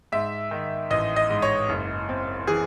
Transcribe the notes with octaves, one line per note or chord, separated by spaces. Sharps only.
G#2 E5
D#3
A1 D#5
D#5
G#2
C#5
F#1
C4
E3 G#4